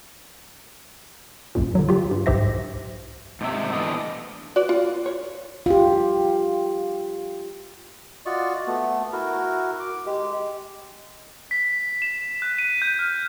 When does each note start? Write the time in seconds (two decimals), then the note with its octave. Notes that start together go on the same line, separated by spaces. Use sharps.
1.55 B1 F#2 A#2
1.75 D3 F#3
1.89 F4 G4
2.11 G2
2.26 B1 G#2 G4 C5 E5 A#6
3.41 G#2 C3 E5
3.73 E3 A3 B3 D4 A4 D#5
4.56 F#4 B4 D5
4.69 F4
5.06 C#5
5.66 F4 G4
8.26 F4 F#4 D5 D#5 C#6
8.67 A3 B3
9.13 E4 F#4 A#4
9.80 D6
10.06 G#3 G4
11.51 B6
12.02 E7
12.42 F#6
12.59 D#7
12.82 G6
12.99 F6